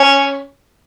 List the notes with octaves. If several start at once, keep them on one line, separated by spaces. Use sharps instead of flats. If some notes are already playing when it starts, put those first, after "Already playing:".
Already playing: C#4